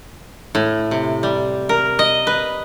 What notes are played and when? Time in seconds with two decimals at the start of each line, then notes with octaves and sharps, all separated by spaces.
0.55 A2
0.91 C3
1.23 G3
1.69 A#4
1.99 D#5
2.27 B4